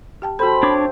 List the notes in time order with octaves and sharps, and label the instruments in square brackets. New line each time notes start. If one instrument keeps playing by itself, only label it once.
[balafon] G4 G5 A5
[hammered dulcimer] F3 C4 C5 [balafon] F#4 A4 [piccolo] B5
[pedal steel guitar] D4 C#5 D6